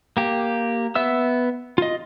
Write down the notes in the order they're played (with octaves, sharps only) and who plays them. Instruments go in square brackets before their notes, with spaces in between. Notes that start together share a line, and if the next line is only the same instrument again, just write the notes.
[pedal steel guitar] A#3 G4
B3 E5 E6
F4 D#5